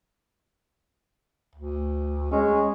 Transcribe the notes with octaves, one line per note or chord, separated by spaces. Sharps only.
D2
G#3 C#4